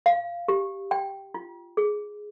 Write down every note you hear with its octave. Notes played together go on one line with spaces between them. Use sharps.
F5
G4
G5
F4
G#4